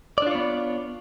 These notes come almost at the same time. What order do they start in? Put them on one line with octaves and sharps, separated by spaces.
D5 D4 F4 C#5 B3